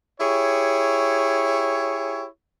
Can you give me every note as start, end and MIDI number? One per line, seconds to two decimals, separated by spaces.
0.21 2.26 64
0.21 2.26 67
0.21 2.26 68
0.21 2.26 73